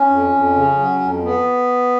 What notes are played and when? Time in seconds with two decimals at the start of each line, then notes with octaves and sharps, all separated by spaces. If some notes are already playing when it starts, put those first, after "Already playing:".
Already playing: C#4
0.10 F2
0.32 F2
0.55 C#3
0.78 F#3
1.00 F2
1.24 B3